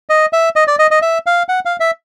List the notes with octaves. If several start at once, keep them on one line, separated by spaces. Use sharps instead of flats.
D#5
E5
D#5
D5
D#5
D#5
E5
F5
F#5
F5
E5